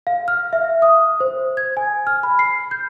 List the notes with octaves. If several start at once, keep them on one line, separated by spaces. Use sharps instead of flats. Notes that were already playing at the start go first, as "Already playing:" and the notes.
F5
F6
E5
D#6
C5
G#6
G#5
F6
B5
C7
G6